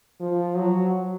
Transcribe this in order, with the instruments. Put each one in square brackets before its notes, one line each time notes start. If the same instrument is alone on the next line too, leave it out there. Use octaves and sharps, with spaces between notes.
[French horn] F3
F#3